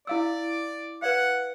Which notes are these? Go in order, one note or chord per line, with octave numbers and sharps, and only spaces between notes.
E4 D5 F5 E6
B4 D5 F5 F#5